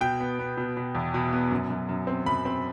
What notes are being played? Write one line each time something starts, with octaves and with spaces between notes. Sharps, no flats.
B2 G5
B3
B3
B2
B2
E2
B2
B3
F#2
F#2
F#2
C4
F#2 B5
C4